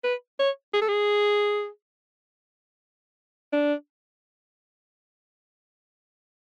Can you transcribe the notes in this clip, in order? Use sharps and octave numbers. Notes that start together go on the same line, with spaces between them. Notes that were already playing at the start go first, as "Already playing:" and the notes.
B4
C#5
G#4
A4
G#4
D4